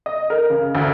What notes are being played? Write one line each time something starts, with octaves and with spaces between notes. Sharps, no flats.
D#5
A#4
C#3
D2